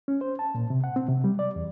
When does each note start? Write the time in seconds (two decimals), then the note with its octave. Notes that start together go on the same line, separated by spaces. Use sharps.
0.08 C#4
0.21 C5
0.39 A5
0.55 A#2
0.70 C3
0.84 F#5
0.96 C4
1.09 C3
1.24 G3
1.39 D5
1.56 E2